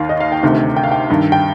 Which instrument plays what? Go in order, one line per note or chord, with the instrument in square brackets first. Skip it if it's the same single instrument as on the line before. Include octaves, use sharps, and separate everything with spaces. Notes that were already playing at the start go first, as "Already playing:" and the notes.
Already playing: [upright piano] D#2 D#3 F5
D#5
F5
G5
D2 C3 D#3
G5
F5
G5
G2 D#3
G5